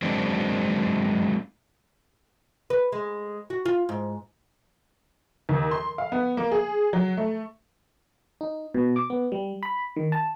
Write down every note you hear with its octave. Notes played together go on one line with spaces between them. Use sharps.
F#3 G#3 A#3 C4 D4 D#4
B4
G#3
F#4
F4
G#2
D#2
C6
F5
B3
A#3
G#4
F#3
A3
D#4
B2
D6
B3
G3
B5
D#3
A5